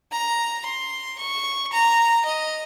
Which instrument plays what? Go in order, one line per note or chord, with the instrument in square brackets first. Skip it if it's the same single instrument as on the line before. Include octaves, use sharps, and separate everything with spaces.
[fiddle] A#5
C6
C#6
A#5
D#5